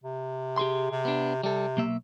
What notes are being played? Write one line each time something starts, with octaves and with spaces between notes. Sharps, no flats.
C3
G4 G#4 C6
C3
B3 D4
C3 G3 A4
B1 A#3 E5